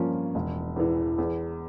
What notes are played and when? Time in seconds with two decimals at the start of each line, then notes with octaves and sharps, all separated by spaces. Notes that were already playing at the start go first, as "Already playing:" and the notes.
Already playing: G2 F3 A#3 C#4 F4
0.35 E1
0.76 E2 E3
1.18 E2